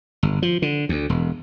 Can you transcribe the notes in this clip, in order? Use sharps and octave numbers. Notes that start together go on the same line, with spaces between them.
G1
F3
D3
D2
E1